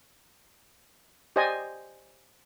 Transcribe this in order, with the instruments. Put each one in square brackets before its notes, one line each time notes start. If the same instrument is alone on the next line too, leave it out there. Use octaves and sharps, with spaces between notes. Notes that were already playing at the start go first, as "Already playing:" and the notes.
[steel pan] G4 C5 D5 D#5 G#5